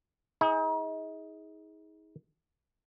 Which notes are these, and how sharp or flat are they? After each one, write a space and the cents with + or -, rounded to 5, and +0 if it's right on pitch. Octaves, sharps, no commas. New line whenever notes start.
D#4 +40 G#4 +0